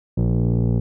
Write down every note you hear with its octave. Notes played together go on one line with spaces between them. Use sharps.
A#1